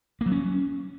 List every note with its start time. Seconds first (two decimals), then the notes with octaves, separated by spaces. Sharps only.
0.21 A#3
0.26 F#3
0.32 C#4